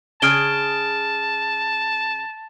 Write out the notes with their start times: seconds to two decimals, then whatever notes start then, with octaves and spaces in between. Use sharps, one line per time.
0.22 C#3 G#4 G#5 A5 F6 D7 G7